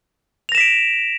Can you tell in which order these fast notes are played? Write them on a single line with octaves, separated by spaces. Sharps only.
F7 A#6 E7 B6 D7